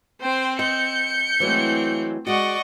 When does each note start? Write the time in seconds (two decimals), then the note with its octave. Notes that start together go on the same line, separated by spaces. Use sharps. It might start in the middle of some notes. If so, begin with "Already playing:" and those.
0.22 C4 C5 G5
0.59 D#5 G6 C#7
1.40 E3 F#3 G#3 A3 C4
2.27 G#3 F#4 D5 D#5 F#5 C#6